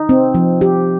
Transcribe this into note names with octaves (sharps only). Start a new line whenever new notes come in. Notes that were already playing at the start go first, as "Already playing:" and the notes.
Already playing: D#4
C4
F3
G4